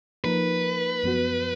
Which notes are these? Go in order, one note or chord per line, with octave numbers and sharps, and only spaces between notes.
F3 A#3 D#4 A#4 B4
F#2 F3 B3 F#4